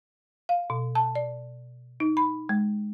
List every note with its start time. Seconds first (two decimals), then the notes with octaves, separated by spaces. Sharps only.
0.49 F5
0.70 B2
0.95 A5
1.15 D5
2.00 D#4
2.17 B5
2.49 G#3